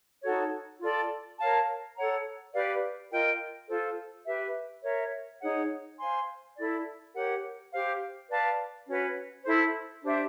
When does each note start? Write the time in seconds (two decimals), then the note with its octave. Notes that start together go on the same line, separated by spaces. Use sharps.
0.23 D#4 F#4 A4 C#5
0.80 F4 A4 D5
1.39 A#4 C#5 F5 A5
1.96 A4 C#5 F#5 A#5
2.53 G4 B4 D5 F5
3.10 F4 A#4 D#5 G5
3.68 F4 A4 C5
4.25 G4 B4 E5
4.83 A#4 C#5 E5
5.41 D#4 G#4 C#5 F#5
5.98 C5 F5 G#5 C6
6.56 E4 A4 D5
7.14 G4 A#4 C#5 F#5
7.72 G4 C5 F5
8.29 B4 D5 F5 A5
8.86 C#4 F#4 B4
9.43 E4 A4 C5
10.02 D4 G4 C5 E5